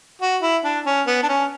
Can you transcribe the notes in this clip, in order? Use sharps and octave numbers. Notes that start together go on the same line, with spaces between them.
F#4
E4
D4
C#4
B3
D4
C#4